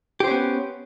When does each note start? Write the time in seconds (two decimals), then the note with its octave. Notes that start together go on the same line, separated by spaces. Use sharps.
0.20 G4
0.24 C5
0.28 C#4
0.31 B3